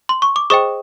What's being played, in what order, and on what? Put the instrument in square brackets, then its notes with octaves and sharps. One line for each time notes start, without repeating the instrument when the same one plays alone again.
[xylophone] C6
C#6
D6
G#4 C5 D#5 G5 C#6 D#6